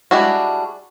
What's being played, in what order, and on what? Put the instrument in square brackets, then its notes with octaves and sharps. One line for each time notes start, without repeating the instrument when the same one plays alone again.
[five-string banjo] G3 G#3 D4 E4 F#4